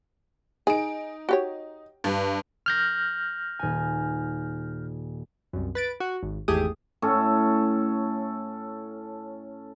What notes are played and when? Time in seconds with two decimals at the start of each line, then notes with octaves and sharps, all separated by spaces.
0.67 D#4 G#4 D7
1.29 F#4 G4 C#5
2.04 G2
2.66 F6 G6 A#6
3.59 D#1 G#5
5.53 C2 F#2
5.75 B4 A6 D7
6.00 F#4
6.23 G#1
6.48 G#1 E2 A3 G4 G#4 D#6
7.02 A2 C#4 A4